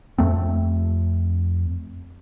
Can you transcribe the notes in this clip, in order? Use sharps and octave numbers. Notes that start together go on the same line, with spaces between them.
F2 A3 C4